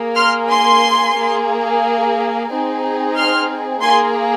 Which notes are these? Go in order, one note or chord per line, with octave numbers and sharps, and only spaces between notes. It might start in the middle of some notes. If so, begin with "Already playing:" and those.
Already playing: A#3 G#4
C6 F6
G#5 C6
A#3 G#4
C4 D#4 G#4
C6 F6
A#3 G#4 G#5 C6